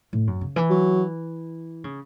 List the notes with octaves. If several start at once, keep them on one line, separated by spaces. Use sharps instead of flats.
A2
F#2
C#3
E3
F#3
C#3